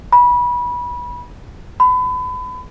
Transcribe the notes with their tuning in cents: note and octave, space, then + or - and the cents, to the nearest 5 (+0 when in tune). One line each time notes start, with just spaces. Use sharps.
B5 -25
B5 +30